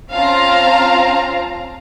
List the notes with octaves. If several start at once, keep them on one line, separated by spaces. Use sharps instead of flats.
C4 C#4 F4 F5 A5 A#5